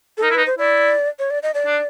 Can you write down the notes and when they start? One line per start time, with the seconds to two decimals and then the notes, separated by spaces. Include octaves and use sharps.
0.18 A4
0.22 D#4 A#4
0.30 E4
0.34 D#4 B4
0.46 C5
0.58 E4 D5
1.19 C#5
1.30 D5
1.43 D#5
1.54 D5
1.66 D4